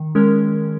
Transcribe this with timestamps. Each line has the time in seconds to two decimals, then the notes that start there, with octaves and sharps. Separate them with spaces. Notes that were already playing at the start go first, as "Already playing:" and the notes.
Already playing: D#3
0.15 G#3 C#4 A#4